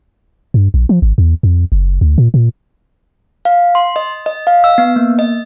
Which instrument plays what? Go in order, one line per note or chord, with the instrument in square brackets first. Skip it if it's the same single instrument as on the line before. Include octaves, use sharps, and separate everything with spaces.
[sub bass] G2
A#1
F3
G#1
E2
F2
F#1
D2
A#2
A#2
[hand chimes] F5
C6
D#5
D#5
F5
E6
B3
A#3
D#5